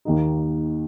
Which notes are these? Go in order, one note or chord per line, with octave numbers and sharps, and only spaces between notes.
D#2 D#3 A#3 D#4